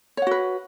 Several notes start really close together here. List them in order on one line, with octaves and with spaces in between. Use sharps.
C#5 F#5 F#4 B4